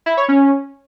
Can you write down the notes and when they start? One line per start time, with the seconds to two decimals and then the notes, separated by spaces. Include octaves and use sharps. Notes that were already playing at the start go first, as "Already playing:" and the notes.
0.06 E4
0.17 C#5
0.28 C#4